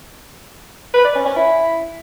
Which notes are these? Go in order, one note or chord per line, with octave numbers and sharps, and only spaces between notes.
B4
D5
C#4
C#4
E4